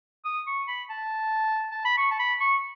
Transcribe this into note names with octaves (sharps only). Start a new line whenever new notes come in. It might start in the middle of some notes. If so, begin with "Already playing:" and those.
D#6
C#6
B5
A5
A5
B5
C#6
A5
B5
C#6